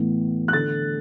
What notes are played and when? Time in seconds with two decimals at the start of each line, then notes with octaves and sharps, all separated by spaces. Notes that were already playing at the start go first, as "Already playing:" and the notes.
Already playing: A2 E3 B3
0.48 F#6
0.53 D3 A3 A6